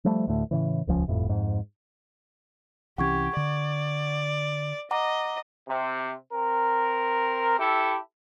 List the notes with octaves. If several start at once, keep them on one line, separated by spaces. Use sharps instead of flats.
F3 G3 A3
D2 A2 A3
A2 C#3 E3
D#1 C#2 F3 C#4
G1 F2 A2
F2 G#2
C2 E3 C#4 G4 F#5 C#6 G#6
D3 D5
D#5 F#5 A#5 D6
C3
C4 A#4
E4 G4 A4